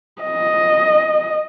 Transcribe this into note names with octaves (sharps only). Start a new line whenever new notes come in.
D#5